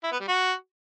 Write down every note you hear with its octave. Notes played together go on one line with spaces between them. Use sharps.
E4
B3
G3
F#4